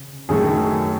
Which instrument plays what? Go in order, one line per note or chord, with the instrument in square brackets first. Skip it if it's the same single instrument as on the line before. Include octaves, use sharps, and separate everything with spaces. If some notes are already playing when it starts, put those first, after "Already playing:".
Already playing: [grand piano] C#3
[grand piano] F#2 D#3 A3 [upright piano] G#4